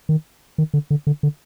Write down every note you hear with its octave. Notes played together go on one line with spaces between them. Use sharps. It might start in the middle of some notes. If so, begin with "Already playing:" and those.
D#3
D#3
D3
D3
D3
D3